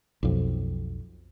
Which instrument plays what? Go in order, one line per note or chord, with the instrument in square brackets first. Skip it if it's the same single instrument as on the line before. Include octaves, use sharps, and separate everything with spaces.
[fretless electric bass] B1 F2